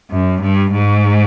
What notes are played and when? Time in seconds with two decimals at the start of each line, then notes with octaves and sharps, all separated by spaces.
0.10 F#2
0.42 G2
0.72 G#2